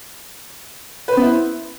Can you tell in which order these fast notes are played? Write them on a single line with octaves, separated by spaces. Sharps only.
B4 C5 B3 E4